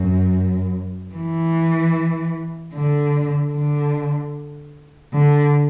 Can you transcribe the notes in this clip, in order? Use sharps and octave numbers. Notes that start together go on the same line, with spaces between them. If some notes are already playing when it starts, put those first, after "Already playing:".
Already playing: F#2
E3
D3
D3
D3